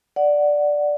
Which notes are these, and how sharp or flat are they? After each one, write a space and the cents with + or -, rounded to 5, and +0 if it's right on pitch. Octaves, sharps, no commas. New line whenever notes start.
D5 +0 F#5 +0